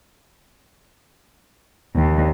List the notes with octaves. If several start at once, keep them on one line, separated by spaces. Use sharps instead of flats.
D#2